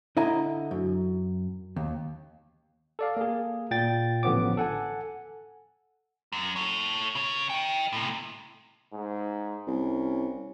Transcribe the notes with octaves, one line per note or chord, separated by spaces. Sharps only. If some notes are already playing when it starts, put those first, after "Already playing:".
D3 E4 D#5 A#5
F#2
D#2
A4 D5 F5
A#3 G#4
A#2 G5 A6
A1 D3 F3 B3 C#5 D6
A4 F#5 G#5
F#2
A4 C#5
C#3 C#5
D#5 G5
A2 C3
G#2
C2 C#4